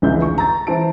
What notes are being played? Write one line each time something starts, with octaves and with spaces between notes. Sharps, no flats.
F1 C#2 D3 E3 G#4 G6
C#6
A#5 A6
E3 C5 A5 D7